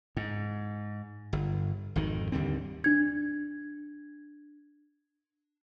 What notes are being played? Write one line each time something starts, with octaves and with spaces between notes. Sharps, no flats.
G#2
G1
G#1 F2 D#3
D#2 D3 G3 C4
D4 G#6